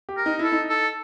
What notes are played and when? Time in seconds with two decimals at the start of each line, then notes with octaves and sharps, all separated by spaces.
0.09 G4
0.17 A#4
0.26 D#4
0.39 E4 A4
0.52 D#4
0.70 A4